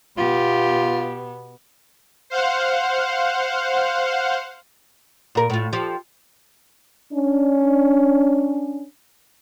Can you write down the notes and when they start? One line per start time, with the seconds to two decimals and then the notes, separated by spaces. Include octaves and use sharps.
0.17 B2 B3 F4 G4
2.30 C5 F5 F#5
5.35 A#2 A#4
5.50 A2 F4
5.73 F3 G4
7.13 C#4 D4